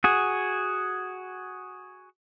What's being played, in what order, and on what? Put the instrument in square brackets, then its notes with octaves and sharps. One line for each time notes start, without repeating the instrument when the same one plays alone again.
[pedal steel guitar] F#4 G#4